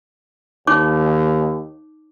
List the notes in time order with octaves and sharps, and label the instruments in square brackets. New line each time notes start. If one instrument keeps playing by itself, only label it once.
[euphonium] D#2 [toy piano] D#4 C#5 D6